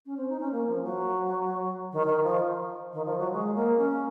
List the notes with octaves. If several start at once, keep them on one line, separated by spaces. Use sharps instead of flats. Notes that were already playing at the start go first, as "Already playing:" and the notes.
C#4
C4
D#4
C#4
A#3
F3
F#3
D#3
D#3
F3
D#3
F3
F#3
G#3
A#3
C#4